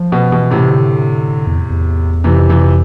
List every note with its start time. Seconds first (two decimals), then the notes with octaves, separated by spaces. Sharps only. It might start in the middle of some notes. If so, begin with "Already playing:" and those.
Already playing: F3
0.12 B2
0.32 B2 E3
0.51 A2 C3
0.70 D3
1.47 E2
1.70 E2
2.24 F2 C3 E3
2.49 C3 E3